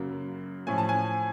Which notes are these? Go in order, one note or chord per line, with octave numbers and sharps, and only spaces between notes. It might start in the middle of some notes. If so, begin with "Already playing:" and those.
Already playing: F#2 C#3 F#3 A#3
A2 F3 A3 C#4 G#5
A5
G#5